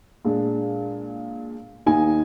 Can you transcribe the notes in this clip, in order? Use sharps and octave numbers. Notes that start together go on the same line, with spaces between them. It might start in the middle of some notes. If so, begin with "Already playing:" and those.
A#2 G#3 D4
D#2 D#3 A#3 D#4 G#5